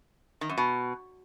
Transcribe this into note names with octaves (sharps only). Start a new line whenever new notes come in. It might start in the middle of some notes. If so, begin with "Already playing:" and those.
D#3
F#2
B2